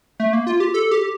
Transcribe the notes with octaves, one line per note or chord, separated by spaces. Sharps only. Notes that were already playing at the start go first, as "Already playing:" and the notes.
A3
A#3
F4
G4
A4
G4